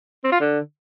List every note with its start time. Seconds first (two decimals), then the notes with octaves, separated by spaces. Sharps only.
0.24 C4
0.32 F4
0.40 D3